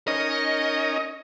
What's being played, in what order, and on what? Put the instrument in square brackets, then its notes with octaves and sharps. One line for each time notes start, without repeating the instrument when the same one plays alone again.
[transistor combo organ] C#4 D#4 A#4 [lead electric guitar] D#5